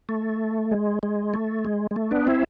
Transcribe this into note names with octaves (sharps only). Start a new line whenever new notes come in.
A3
G#3
G#3
A3
G#3
G#3
A3
B3 D4
C4 E4